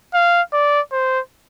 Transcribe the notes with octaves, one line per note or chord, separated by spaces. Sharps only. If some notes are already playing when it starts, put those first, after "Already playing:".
F5
D5
C5